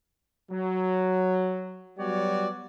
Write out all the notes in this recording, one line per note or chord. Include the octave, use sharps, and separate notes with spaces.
F#3
F#3 G3 B3 F#4 C#5 D5